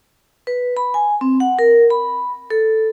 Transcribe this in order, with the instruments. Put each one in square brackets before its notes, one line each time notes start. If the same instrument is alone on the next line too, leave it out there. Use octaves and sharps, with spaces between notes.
[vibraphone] B4
B5
G#5
C4
F#5
A#4
B5
A4